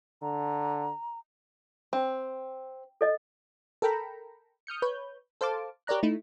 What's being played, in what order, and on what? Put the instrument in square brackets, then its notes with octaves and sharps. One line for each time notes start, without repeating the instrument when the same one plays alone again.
[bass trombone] D3 [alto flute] A#5
[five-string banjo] C4
[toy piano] A4 D#5
[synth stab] A4 A#4 G5 A#5 B5
D#6 F6 G6 C#7
B4 C#5 G6
A4 C5 F5 A5 D6
G4 A#4 C#5 D5 A#5 F#6
A3 D#4 E4